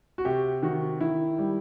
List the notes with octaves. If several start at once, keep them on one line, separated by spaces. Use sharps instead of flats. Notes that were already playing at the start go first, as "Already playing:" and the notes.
F#4
C3 G4
D#3 F#4
D#3 E4
G3